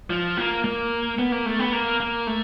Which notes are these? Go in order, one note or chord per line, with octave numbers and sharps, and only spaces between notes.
F3
A#3
A#3
B3
A#3
A3
B3
A#3
A#3
A3